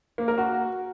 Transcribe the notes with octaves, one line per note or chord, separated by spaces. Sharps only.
A#3
A#4
F#4